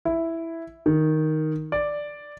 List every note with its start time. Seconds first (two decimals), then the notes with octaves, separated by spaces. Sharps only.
0.05 E4
0.86 D#3
1.72 D5